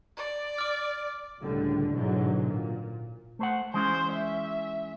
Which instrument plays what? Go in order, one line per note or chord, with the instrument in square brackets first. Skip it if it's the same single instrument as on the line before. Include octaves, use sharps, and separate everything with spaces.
[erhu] D5
[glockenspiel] D6 F6
[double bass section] C#2 A2 D3 G3
G#2 B2 D3 E3 F#3
A#2
[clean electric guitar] A3 C5 F#5
[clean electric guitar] E3 G#3 C#4 [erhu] C5
[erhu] E5